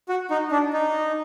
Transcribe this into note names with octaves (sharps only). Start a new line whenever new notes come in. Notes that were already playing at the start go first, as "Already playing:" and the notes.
F#4
D#4
D4
D#4